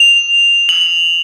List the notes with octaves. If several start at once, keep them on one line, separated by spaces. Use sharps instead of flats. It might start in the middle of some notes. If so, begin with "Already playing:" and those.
Already playing: F7
F#7